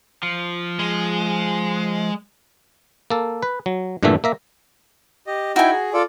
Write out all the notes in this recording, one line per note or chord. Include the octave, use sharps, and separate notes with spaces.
F3
G#3
A#3 A4
B4
F#3
G2 A#2 D3 E3 A3 E5
A#3 E5 A#5
G4 D#5
D#4 E4 F#4 G5 G#5
G#4
F4 A4 D5